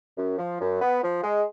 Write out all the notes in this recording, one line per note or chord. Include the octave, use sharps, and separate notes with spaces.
F#2
F3
F#2
B3
F3
G#3